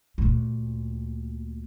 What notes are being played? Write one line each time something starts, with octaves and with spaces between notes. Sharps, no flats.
D2 A#2